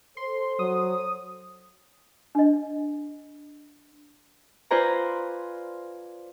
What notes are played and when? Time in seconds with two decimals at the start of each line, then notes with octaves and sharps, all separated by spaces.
0.17 A4 C5 C6
0.59 F#3 D#6
2.35 D4 D#5
4.71 F4 B4 C5 D5 G#5 A#5